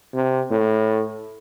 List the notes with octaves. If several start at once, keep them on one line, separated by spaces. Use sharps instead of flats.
C3
A2